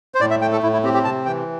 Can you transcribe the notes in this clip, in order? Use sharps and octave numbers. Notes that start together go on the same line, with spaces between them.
C5
A2 D5
E5
A3 G5
A4
A2 E4
E4
C4 G4
G4
C3 A5
E3 G5